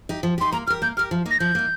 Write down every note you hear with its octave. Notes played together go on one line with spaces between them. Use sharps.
D#4 G4
F3
D#4 G4 C6
A#3 A#5
G4 A#4 F6
A#3 G6
G4 A#4 F6
F3
A#3 D#4
A#6
F3 G6
A#3 D#4